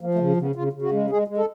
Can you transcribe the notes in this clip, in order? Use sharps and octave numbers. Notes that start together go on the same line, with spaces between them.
F3 A#3
A3
C#3
C#3
B3
C#3 F4
C#3
F#4
G#3
G#3 G#4
G#3
A4